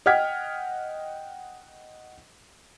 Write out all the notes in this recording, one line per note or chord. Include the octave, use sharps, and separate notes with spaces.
D#5 F#5 G5 F6 G#6 B6